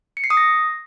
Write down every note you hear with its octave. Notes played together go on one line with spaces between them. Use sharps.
C#7
C7
D#6
A#6